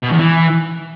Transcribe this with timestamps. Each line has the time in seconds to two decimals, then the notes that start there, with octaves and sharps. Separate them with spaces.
0.03 B2
0.11 E2
0.20 E3